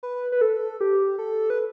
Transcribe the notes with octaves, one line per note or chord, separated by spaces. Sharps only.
B4
B4
A4
G4
A4
B4